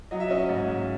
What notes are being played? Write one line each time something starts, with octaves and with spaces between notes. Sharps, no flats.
F#3 D#5
E5
C#4 D#5
G#2
G#2